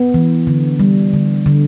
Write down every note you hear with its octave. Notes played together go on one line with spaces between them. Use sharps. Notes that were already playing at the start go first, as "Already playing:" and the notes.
Already playing: B3
E3
D3
G3
D3
D3